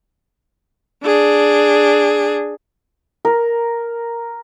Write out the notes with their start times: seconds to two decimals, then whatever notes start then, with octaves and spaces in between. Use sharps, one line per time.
1.04 D4 G#4
3.25 A#4